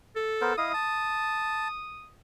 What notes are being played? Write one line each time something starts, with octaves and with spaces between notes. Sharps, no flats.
A4
B3 A#4 C5
E4 D#5 F5 D#6
A5